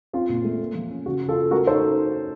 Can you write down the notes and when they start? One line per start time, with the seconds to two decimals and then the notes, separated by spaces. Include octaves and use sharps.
0.13 C4 F4
0.29 A#2
0.44 A3
0.60 A#3
0.75 F3
0.90 C#4
1.06 C#3 F#4
1.21 C#3
1.29 F4 A4
1.36 C#4
1.51 A3 F#4 A#4
1.67 D#4 A4 C5